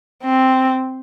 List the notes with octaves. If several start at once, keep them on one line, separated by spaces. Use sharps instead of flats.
C4